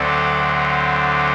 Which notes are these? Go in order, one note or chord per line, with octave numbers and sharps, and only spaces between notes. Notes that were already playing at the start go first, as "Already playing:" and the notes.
Already playing: D2 D3 F#3 C4 A4